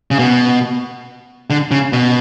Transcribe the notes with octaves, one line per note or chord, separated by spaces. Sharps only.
C#3
B2
D3
C#3
B2